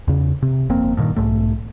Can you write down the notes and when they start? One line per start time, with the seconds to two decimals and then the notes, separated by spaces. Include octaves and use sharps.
0.08 E2 C#3
0.42 C3
0.69 G1 F2 A#3 C4
0.97 G2 A#2 D#3
1.16 B1 G#2 A3